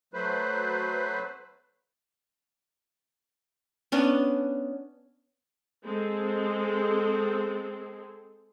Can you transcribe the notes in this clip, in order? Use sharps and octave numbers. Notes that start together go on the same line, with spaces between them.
F#3 A3 B4 C5
B3 C#4 D4
G#3 C4 A4